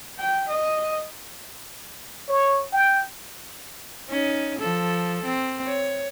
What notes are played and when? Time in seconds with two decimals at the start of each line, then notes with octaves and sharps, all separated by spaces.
0.19 G5
0.49 D#5
2.29 C#5
2.73 G5
4.10 C#4 D#4
4.60 F3 A4
5.25 C4
5.66 C#5